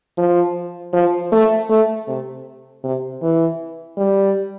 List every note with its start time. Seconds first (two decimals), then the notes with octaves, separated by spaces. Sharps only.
0.18 F3
0.93 F3
1.32 A3
1.69 A3
2.08 C3
2.84 C3
3.22 E3
3.97 G3